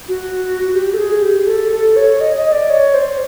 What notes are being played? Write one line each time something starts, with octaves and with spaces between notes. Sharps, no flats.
F#4
G4
A4
G#4
G4
A4
A4
C#5
D#5
D#5
D5
C#5
C5